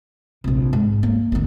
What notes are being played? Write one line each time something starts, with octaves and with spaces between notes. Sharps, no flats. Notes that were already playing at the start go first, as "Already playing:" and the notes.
A#1 C3
G#2
A#3
G#1 D2